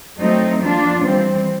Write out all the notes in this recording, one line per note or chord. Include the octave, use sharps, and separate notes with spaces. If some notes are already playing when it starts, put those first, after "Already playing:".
F#3 A3 C4 D#4
F3 A#3 D4 F4
E3 G3 C4